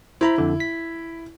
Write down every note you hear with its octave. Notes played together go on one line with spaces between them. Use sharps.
E4 C5 A#5 B5
F2 D3
B6